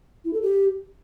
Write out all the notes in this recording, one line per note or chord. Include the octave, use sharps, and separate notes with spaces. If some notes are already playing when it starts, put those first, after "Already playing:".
E4
A4
G4